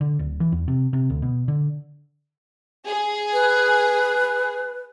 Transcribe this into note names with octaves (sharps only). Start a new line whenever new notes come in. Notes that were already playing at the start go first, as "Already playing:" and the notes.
D3
D1
E3
E2
C3
C3
D2
B2
D3
G#4
B4